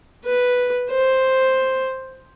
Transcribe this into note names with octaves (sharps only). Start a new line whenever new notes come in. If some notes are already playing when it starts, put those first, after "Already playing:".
B4
C5